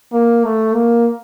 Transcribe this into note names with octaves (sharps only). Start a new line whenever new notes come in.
A#3
A3
A#3